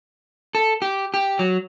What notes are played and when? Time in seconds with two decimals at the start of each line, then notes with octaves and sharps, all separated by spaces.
0.55 A4
0.82 G4
1.14 G4
1.39 F#3